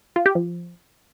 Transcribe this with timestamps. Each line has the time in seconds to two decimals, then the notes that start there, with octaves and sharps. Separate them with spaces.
0.16 F4
0.26 G4
0.35 F3